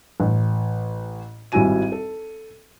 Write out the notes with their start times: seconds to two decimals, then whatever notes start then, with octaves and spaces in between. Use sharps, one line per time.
0.20 A1
1.52 G#1 G3 E4 F#4 G#5 D#7
1.92 A4